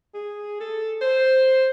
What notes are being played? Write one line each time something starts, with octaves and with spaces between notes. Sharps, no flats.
G#4
A4
C5